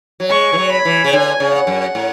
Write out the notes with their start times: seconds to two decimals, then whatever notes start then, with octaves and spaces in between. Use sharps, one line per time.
0.20 F#3
0.30 G#3 C#6
0.53 E3
0.58 F#3
0.72 B5
0.85 E3
1.04 C#3
1.13 D3 G#5
1.40 C#3
1.54 F#5
1.67 F#2
1.95 A2